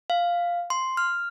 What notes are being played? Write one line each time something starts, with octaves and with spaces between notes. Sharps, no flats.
F5
C6
F6